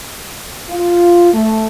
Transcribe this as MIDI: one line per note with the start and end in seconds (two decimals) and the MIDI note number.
0.70 1.32 65
1.34 1.67 57